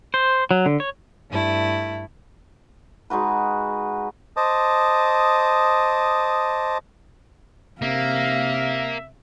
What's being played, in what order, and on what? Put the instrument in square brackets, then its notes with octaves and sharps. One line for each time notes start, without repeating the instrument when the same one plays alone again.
[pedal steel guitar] C5
F#3
D3
C#5
[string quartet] G2 A3 E4
[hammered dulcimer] G#3 D#4 F#4 B4
[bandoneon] C5 D#5 A5 D6 D#6
[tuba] C3 [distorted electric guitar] A#3 [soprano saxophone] E5 [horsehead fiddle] F5